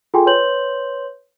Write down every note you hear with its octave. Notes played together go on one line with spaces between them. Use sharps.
F4 G#4 A4 G5 G#5 C6
B4 C#5 C6 G6 F#7